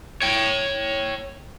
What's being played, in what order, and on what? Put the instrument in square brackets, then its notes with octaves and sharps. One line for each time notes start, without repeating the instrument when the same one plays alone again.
[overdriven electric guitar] C#5 G5